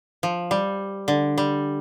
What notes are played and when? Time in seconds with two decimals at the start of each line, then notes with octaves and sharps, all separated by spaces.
0.23 F3
0.51 G3
1.08 D3
1.38 G3